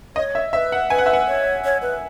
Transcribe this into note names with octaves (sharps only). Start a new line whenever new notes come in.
C#5 D#5
E5
C#5 E5
B4
F#5
B4 G#5
F#5
E5
F#5
C#5
C#5
B4